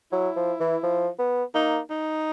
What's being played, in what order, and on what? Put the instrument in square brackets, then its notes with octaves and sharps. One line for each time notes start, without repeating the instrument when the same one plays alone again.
[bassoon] F#3 [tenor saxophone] E4
[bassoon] F3
E3
F3
B3
[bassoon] A#3 [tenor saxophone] D#4
[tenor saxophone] D#4